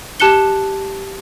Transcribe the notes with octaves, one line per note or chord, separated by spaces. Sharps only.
G4 A5 F#6 C#7 G7